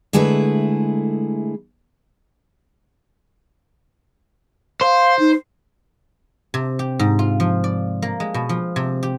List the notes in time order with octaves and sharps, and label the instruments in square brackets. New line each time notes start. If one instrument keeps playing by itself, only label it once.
[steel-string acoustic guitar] D3 G#3 A3 E4 G#4 B4
[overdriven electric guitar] C5 [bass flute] F5
[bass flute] D#4
[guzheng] C3
G4
G#2
F4
F3
D5
A#3
G#3
B2
F3
C3
G4